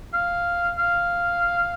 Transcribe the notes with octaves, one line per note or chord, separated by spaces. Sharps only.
F5
F5